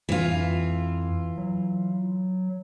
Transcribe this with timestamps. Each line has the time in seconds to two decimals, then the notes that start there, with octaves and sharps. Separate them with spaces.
0.09 F2 E3 F4
1.38 F#3